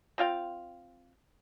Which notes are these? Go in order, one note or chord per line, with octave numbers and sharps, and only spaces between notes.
C4 F4 F5 G5